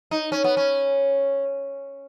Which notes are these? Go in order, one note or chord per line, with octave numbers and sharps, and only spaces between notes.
D#4
C#4
B3
C#4